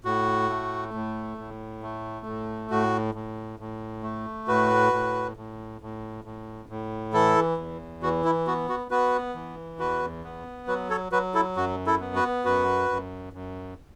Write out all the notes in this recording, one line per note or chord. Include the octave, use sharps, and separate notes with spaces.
A2 F#4
A3
A2
A2
A3
A2
A2 F#4
A2
A2
A3
A2 F#4 B4
A2
A2
A2
A2
A2
E3 E4 A4
E2
E3 F#4
E4
B3 F#4
F#4
B3 F#4 B4
E3
E2 F#4 B4
B3
F#3 F#4 B4
A4 C#5
F#3 F#4 B4
E4 A4
F#2 F#4
E4 A4
B3
F#4 B4
F#2 F#4 B4
F#2
F#2